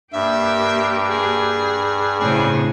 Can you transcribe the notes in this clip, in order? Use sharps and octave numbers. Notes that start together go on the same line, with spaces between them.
G2 A#3 G4 E5
G#4
A2 C#3 C4 G#4